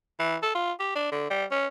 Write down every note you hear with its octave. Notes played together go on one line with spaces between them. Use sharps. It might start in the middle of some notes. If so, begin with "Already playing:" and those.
E3
A4
F4
G4
D4
D3
G3
C#4